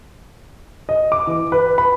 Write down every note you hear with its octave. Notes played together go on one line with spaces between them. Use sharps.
D#5
D6
E3
B4
B5